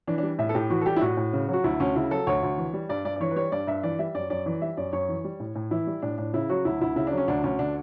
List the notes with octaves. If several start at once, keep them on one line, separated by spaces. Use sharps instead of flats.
E3 D4
D4
G3
A2 E5
A4
A2 G4
E3 F#4
A4
G3 G4
E4
A2 F#4
A2
C#3
F#3 F#4
D2 E4
D2 C#4
C#3 E4
F#3 A4
D2 C#5
D2
E3
G3
G2 D5
G2 D5
D5
E3 C#5
B4
G3 C#5
G2 D5
G2 E5
E3 D5
G3 E5
F#2 D5
F#2 D5
E3 D5
G3 E5
F#2 D5
F#2 C#5
E3
G3
A2
A2
E3 E4
G3
A2 D4
A2 D4
C#3 E4
F#3 F#4
D2 E4
D2 E4
C#3 E4
D4
F#3
C#4
D2 D4
D2 C#4
D3 D4